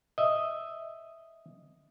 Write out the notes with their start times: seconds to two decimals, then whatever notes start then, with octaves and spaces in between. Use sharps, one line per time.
0.18 D#5 E5